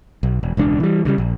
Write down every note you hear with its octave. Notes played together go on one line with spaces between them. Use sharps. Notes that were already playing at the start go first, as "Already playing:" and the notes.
B1
E1
E1 C#2 C4 D4
E3 G3
G2 C#3 G3
A#1